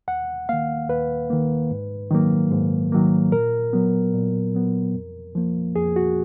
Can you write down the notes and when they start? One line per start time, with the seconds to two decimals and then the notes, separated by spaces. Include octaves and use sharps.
0.08 D#2 F#5
0.49 D#3 A#3 F5
0.89 D#2 B4
1.30 D#3 A#3
1.71 G#2
2.11 D#3 F#3 A#3
2.52 G#2
2.92 D#3 F#3 A#3
3.32 A#2 A#4
3.73 F#3 B3
4.14 A#2
4.54 F#3 B3
4.94 F2
5.35 F3 A#3
5.75 F2 G#4
5.96 F#4